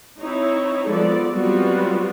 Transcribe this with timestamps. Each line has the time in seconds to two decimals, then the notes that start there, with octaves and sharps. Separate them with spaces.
0.21 C4 D#4 E4 C#5
0.88 F3 F#3 G#3 B3 A4 D5
1.29 F#3 G3 B3 C4 F4 F#4